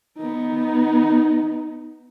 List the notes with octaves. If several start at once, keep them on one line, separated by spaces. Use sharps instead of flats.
B3 D#4